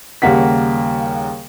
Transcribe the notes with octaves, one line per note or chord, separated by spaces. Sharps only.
D#2 C#3 G3 A#3 F#5 B6